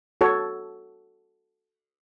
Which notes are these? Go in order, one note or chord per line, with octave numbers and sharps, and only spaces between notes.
F#4 A4 C#5